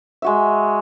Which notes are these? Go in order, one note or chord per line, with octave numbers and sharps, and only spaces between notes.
G#3 F#4 E5